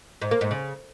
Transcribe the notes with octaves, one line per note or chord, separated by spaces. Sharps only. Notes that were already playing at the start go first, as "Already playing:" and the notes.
G#2
A#3
G#2
C#3